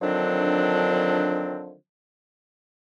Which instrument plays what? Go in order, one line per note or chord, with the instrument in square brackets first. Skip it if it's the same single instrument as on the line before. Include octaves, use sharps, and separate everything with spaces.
[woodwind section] D3 D#3 F3 F#3 C4 D4